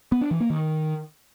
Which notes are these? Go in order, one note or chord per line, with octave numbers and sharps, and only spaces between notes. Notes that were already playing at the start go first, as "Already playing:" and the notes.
B3
D4
E3
A#3
D#3